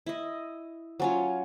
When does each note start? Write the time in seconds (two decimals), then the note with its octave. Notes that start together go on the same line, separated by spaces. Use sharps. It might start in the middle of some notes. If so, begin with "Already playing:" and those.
0.06 E4 D#5
1.00 F#3 C#4 F4